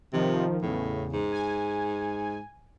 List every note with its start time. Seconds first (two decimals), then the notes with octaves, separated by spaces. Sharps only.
0.13 C3 D#3 F3
0.62 E2 A2 C#3
1.12 G#2
1.31 G#5